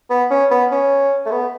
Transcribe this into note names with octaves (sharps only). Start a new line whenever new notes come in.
B3
C#4
B3
C#4
A3
B3